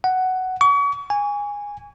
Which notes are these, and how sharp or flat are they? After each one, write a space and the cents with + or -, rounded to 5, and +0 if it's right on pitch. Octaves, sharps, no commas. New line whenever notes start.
F#5 +10
C#6 +40
G#5 -15